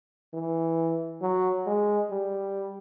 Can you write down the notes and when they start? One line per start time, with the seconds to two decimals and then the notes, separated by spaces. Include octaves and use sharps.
0.34 E3
1.22 F#3
1.67 G#3
2.11 G3